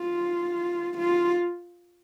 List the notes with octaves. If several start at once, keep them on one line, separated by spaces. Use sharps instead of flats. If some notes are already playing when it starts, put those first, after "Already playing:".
Already playing: F4
F4